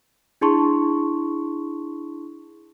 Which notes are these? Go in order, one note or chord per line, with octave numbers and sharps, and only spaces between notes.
D4 E4 G#4 A5 C6 C#6